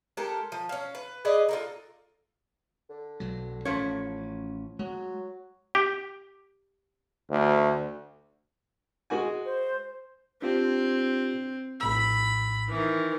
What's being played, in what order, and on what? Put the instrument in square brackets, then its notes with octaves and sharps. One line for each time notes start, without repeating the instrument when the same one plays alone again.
[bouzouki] G#3 G4 A4 A#4
F3
C#4 F5
B4
G#4 B4 D5 D#5
F4 A4 A#4
[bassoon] D3
[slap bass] B1 F#3
[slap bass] A1 C#4 [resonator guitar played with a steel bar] F3 C#5
[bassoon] F#3 [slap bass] G#3
[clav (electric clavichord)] G4
[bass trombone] D2
[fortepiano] G#3 F#4 G#5
[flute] C5
[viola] C4 [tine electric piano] D4 F4 G4
[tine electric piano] A#1 A2 E6 [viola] B5
[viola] D#3 E3